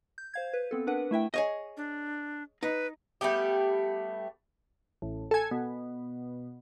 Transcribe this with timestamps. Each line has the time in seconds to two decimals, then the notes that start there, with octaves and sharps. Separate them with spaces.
0.18 G6
0.34 C5 F5 G#6
0.53 B4
0.71 B3 C4 A4
0.87 D4 A#4 B4 F#5
1.11 A3 E4 E5 G5
1.34 G#4 C#5 D#5
1.77 D4
2.63 D#4 B4
3.21 G3 A3 B3 G4
5.02 A1
5.31 A4 G#5
5.51 B2